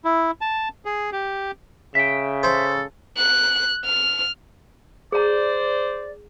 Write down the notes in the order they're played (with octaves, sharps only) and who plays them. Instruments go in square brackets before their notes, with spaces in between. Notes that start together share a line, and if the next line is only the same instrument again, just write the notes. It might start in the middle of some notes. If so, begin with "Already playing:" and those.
[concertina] E4
A5
G#4
G4
[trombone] C#3 [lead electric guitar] E5 G5
[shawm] A4 [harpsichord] C5
[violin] F#6
F6
[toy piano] G#4 A#5 [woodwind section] C5 D5